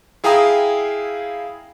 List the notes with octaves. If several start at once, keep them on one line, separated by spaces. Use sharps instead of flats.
E4 G#4 F5 G5 A#5 D#6